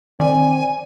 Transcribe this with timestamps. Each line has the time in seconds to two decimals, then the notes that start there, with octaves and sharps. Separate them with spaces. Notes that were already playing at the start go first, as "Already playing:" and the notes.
0.20 D#3 C4 D5 G#5